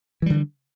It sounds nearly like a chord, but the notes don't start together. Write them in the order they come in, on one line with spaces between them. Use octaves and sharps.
E3 G3 D3